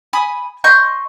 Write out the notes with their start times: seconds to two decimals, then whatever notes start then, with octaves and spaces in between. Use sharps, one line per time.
0.13 G#5 B5 D#6
0.64 D#5 C6 C#6 G6